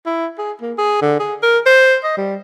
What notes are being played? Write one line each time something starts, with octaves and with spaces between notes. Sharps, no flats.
E4
G#4
A#3
G#4
D3
G#4
A#4
C5
D#5
G3